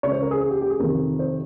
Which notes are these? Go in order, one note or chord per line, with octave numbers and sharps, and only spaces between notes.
C#2 C#3 C#5
C5
A#4
G#4
G#4
G4
G4
G#4
F2 C3 D#3 A#4
C5